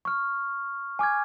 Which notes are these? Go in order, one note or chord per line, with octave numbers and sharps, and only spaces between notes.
C#6 F6
G#5 D6 F6 G#6